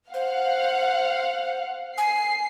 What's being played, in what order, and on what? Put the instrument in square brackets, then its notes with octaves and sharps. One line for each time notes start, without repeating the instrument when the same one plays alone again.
[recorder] C5 [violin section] F5 F#5
[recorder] G#5 [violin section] C7